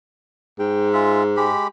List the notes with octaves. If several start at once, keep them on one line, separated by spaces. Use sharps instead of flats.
G#2 G5
G#3 F4 E5
G#3 G4 B5